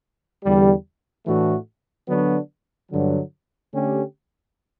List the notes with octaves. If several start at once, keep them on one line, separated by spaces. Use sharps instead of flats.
E2 D3 G3
A2 E3 A3 D4 F#4
D3 F#3 B3 D4 F#4
G2 D3 F#3
D3 A3 C#4 G4